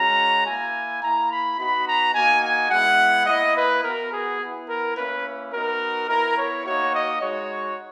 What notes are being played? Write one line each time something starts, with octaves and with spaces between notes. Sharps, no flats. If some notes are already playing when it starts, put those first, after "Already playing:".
Already playing: G#3 C#4 F#4 A#5
A#3 E4 G#5
A#3 E4 A#5
B5
B3 D#4 F#4 B5
A#5
A#3 D#4 F#4 G#5
G#5
G#3 B3 E4 F#5
A#3 E4 D#5
B4
B3 F#4 A#4
G#4
B3 E4
A#4
A#3 C#4 E4 B4
B3 D#4 F#4 A#4
B3 E4 A#4
C#5
A#3 D#4 F#4 C#5
D#5
G#3 D#4 F#4 C#5